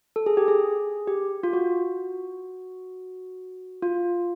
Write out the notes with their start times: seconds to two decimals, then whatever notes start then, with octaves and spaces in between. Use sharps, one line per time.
0.16 A4
0.26 G#4
0.37 G4
0.48 G#4
1.08 G4
1.43 F4
1.53 F#4
3.83 F4